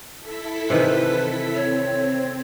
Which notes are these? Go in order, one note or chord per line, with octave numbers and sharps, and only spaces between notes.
E4 A4 B6
C3 D#3 E3 B4
C4 C#5